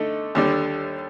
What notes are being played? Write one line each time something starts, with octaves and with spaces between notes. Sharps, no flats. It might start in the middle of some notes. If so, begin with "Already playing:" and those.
Already playing: D3 A3 D#4
D#2 D3 G3